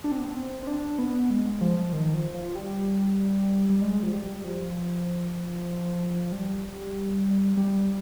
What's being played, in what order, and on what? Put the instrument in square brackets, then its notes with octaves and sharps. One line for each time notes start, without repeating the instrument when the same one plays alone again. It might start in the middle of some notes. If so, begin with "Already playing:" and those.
[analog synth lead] D4
C4
B3
C4
C4
D4
B3
G#3
F3
D#3
F3
F3
G3
G3
G#3
F3
G3
F3
G3
G3